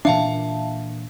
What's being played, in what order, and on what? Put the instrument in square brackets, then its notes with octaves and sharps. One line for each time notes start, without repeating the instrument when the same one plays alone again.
[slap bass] A#2 E3 D4 [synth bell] E5 F5 A5